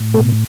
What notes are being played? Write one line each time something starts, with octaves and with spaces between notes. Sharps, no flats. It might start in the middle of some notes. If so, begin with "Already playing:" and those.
Already playing: A2
B2 A3 A4